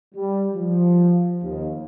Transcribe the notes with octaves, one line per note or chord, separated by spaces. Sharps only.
G3
F3
D#2